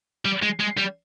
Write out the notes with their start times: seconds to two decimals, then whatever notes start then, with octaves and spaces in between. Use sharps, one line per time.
0.25 G3
0.43 G#3
0.60 G#3
0.78 G3